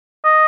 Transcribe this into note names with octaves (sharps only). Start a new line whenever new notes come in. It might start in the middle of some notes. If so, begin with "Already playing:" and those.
D#5